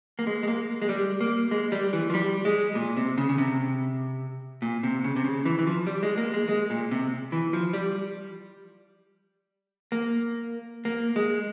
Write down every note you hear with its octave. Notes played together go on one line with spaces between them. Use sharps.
A#3
G#3
G#3
A#3
G#3
G3
A#3
G#3
G3
E3
F3
G3
G#3
A#2
C3
C#3
C#3
C3
A#2
C3
C#3
C3
C#3
E3
E3
F3
G3
G#3
A#3
G#3
G#3
A#2
C3
E3
F3
G3
A#3
A#3
G#3